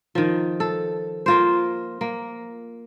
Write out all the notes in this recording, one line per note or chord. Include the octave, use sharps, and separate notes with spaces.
D#3 F3
A4
A#3 F4 C5
A#3